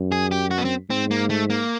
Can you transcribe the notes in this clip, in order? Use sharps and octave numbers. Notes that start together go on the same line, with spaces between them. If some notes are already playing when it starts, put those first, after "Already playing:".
Already playing: F#2
G#4
G4
F#4
B3
C4
G#2 C4
A#3
A3
A#3